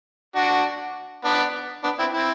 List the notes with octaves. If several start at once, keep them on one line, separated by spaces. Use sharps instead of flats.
D4 F#4
B3 D4
B3 D4
C4 E4
C4 E4